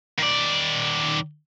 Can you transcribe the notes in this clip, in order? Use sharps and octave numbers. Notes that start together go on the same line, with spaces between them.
D#3 D5